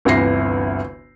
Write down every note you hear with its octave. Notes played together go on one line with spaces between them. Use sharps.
G1 D2 C3 E3 A#6 C7